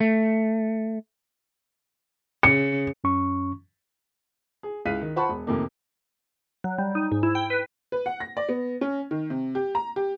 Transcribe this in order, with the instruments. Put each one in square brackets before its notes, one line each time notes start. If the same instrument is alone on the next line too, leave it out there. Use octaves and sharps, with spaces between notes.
[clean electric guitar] A3
[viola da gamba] C#3 [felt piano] C#7
[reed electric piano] F#2 C#4 C#6
[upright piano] G#4
C#2 E4 F5 F#6 B6 D#7
D#3
F4 C5 F#5 A5 B5 C#6
E1
F2 A2 C3 D#3 A#3
[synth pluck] F#3
G3
D#4
G#2
E4
G5
B4
[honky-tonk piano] B4
F#5
A#6
D5
B3
C#4
D#3
C3
G4
A#5
G4